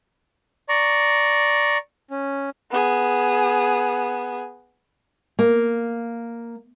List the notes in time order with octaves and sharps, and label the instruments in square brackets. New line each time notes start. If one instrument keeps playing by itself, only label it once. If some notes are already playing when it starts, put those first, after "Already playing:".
[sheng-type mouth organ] D5 A#5 C#6
C#4
[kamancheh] B3 G#4
[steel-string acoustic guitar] A#3